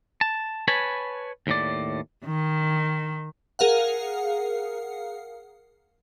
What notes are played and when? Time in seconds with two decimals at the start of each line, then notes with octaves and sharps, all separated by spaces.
0.21 A5
0.68 B4 C#5 G#5 A5 B5
1.47 D#2 A2 D5
2.25 D#3
3.59 G#4 A#4 F5 F#5